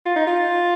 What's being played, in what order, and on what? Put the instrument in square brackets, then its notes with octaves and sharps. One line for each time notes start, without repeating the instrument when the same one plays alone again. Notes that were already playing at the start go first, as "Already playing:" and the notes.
[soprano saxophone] F4
D#4
F4